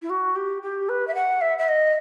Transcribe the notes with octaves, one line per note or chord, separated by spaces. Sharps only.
E4
F#4
G4
G4
B4
E5
F#5
E5
E5
D#5